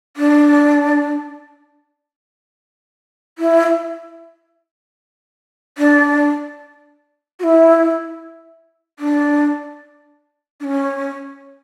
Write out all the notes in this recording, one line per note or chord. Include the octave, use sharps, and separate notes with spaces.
D4
E4
D4
F#4
E4
D4
D4
C#4